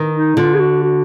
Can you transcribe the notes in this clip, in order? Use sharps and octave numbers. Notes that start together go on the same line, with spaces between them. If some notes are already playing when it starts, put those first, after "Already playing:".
Already playing: D#3
D#4
D3 F4
G#4
F#4
F#4